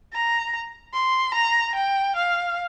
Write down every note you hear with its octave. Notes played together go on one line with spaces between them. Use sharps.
A#5
C6
A#5
G5
F5